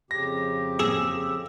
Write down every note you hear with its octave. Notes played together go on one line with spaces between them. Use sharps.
F2 C#3 G4 A#6
G#4 E6 E7